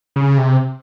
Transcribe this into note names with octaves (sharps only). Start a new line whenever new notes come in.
C#3
C3